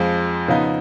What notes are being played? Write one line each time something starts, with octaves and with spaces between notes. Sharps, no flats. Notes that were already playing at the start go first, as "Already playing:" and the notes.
Already playing: F2 F3 G#3
C#3 F3 B3 D#4